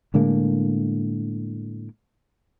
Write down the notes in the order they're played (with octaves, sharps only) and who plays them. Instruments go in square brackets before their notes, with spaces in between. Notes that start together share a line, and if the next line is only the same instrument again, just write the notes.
[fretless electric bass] A2 D3 G#3 A#3